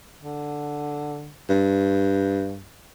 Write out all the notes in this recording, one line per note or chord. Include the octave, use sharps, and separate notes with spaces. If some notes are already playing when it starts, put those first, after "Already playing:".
D3
G2